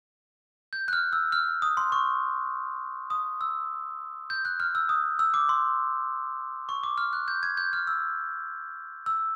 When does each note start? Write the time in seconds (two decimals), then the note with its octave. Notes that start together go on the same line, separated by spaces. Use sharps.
0.73 G6
0.88 F#6
0.93 F6
1.13 E6
1.32 F6
1.62 D#6
1.77 C6
1.92 C#6
3.10 D#6
3.41 E6
4.30 G6
4.45 F#6
4.60 F6
4.75 E6
4.89 D#6
5.19 E6
5.34 D6
5.49 C6
6.69 C#6
6.84 D6
6.98 F6
7.13 F#6
7.28 G6
7.43 G#6
7.57 G6
7.73 F6
7.87 E6
9.06 E6